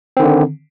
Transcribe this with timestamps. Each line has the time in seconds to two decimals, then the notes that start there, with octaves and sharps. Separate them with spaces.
0.17 C4
0.19 D#3
0.22 D3